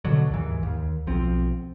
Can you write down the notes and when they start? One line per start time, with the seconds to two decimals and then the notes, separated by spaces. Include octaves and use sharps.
0.05 B2 D3 F#3
0.30 D#2 G#2 E3
0.63 D#2
1.07 B1 F3 C4